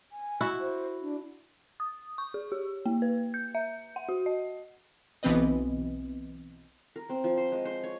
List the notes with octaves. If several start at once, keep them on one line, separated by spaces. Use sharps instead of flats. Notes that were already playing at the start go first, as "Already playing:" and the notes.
G#5
E4 F#4
C5
D4
D#6
C#6
G#4
G4
A#3
B4
G6
E5
F#5
F#4
D#5
B1 E3 B3 C4 B4 D#5
A#4
C4
F3
C5
G#3
C5
C#5